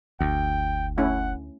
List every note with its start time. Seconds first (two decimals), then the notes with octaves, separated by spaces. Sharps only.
0.21 F#1 D2 G5
0.98 A3 C#4 E4 F#5